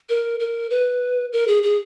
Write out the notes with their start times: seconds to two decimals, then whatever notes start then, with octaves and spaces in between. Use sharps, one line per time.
0.09 A#4
0.40 A#4
0.70 B4
1.33 A#4
1.48 G#4
1.63 G#4